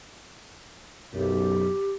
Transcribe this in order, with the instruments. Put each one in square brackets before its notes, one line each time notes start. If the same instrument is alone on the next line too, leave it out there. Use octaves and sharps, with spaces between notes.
[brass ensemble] B1 F#2 [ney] G4